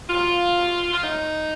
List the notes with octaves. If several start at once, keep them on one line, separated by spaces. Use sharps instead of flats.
C3 F#3 F4
C3 F#3
F4
A2 F#3 D#4